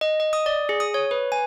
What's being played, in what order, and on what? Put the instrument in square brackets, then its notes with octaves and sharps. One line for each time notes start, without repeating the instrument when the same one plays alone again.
[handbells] D#5
D#5
D#6
D5
G#4
D#6
C#5
B4
G#5